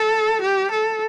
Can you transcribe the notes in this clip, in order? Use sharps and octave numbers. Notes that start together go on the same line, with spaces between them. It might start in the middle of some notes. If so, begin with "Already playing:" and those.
Already playing: A4
G4
A4